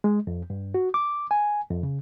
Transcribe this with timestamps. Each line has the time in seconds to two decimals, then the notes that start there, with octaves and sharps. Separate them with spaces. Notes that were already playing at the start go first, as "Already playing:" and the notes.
0.04 G#3
0.27 F2
0.50 G2
0.74 F#4
0.94 D6
1.31 G#5
1.71 F2
1.83 C#3